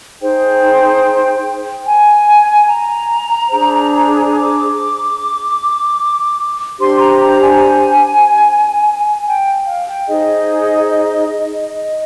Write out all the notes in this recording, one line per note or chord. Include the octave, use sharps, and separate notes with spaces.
D#4 G#4 C5 G5
G#5
A#5
D4 G#4 C5
D6
D4 G4 C5 C6
A#5
A#5
G#5
G5
F5
G5
D#4 G#4 C5 D#5
D#5